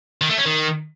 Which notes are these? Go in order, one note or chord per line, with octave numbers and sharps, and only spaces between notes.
D#3
A3
C#4
D#3